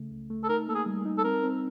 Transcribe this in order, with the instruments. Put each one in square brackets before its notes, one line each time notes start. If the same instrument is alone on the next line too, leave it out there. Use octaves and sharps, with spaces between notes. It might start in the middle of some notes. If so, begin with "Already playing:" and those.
Already playing: [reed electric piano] C#3 A3
C#2
A3
[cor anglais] A4
[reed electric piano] D#4 [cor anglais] A#4
[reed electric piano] A#3 [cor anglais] A4
[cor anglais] G#4
[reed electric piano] G3
D#4
[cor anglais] A4
[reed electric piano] C4 [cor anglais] A#4
[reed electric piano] C4